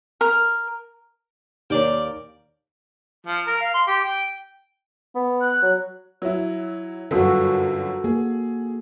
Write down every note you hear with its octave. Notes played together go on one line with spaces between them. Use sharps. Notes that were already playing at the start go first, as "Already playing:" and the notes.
A#4
D#2 G4 A#4 C#5 D5 G5
F3
A#4
F5
C6
G4
G5
B3
F#6
F#3
F#3 E4
G1 F#2 F#4 A4
A#3 G#4